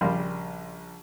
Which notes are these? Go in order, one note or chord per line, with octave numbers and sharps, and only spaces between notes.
A#1 C#3 G3 A#4 F5 C6